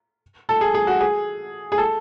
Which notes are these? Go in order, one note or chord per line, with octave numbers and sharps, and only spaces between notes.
A4
G#4
G#4
F#4
G#4
G#4
A4